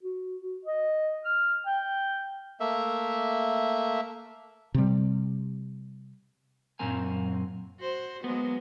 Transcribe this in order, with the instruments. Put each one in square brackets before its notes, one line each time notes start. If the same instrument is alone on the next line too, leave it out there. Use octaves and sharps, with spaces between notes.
[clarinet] F#4
F#4
D#5
F6
G5
[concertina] A3 A#3 E5
[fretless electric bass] C3 G3
[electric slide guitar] F#2 A#2 F#3 C4 A#4 G#5
[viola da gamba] F#4 C5
[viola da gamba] F#3 G#3 A#3 [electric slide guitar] B3